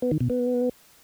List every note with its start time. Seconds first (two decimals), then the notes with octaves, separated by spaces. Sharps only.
0.02 B3
0.11 D#3
0.20 B2
0.30 B3